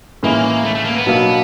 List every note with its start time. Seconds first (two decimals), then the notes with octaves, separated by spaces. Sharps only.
0.23 A2 E3 G#3 A#3 C#4 E4
0.64 A3
0.75 A3
0.84 A#3
0.95 B3
1.06 B2 F#3 A#3 D4